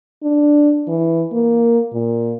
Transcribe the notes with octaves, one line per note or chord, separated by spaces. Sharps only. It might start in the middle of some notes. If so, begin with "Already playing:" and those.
D4
E3
A#3
A#2